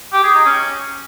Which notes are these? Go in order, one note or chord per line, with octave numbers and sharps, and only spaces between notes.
G4
G#4
D#4
C#4